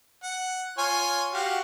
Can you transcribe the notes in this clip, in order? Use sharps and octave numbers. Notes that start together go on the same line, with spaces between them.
F#5
F4 C#5 G#5
F#4 G4 F5